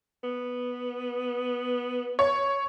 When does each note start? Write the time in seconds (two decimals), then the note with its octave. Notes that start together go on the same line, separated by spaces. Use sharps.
0.24 B3
2.19 C#5